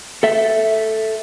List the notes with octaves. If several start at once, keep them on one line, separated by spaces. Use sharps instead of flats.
A4 E5